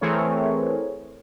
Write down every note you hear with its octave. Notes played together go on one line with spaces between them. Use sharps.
E3 A3 C4 G#4 A#4 C#5